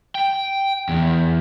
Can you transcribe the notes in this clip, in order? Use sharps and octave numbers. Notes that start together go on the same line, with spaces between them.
G5
E2